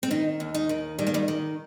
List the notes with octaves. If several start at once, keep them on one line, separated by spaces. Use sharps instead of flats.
C4
D#3 D#4
D#2
D#4
D#3
D#3 G3
A#3
G3
D#3